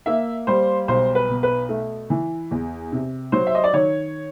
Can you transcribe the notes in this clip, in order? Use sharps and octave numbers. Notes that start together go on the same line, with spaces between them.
A#3 E5
G3 C5
B1 C5
B4
B2
B4
A3
E3
E2
C3
F#3 C5
E5
D#5
D5
D#3 C#5